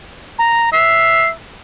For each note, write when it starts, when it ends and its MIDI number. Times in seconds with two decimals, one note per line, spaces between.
0.39 0.70 82
0.73 1.31 76
0.73 1.28 96